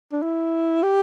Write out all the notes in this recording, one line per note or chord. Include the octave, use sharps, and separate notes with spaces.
D4
E4
G4